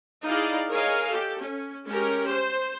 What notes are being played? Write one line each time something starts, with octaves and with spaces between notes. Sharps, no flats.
D#4 E4 G#4 D5 D#5 F5
G#4 A#4 C#5 D#5 F5 G#5
G4 A4
C#4
G#3 C#4 G4 A#4
C5